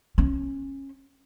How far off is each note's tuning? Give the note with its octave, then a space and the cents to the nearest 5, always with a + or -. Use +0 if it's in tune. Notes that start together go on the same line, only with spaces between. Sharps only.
C#4 -20